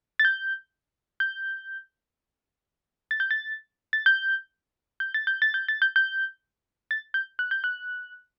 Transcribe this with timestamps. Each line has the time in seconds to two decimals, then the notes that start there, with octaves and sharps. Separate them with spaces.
0.20 A6
0.25 G6
1.20 G6
3.11 A6
3.20 G6
3.31 A6
3.93 A6
4.06 G6
5.00 G6
5.14 A6
5.27 G6
5.42 A6
5.54 G6
5.68 A6
5.82 G6
5.96 G6
6.91 A6
7.14 G6
7.39 F#6
7.51 G6
7.64 F#6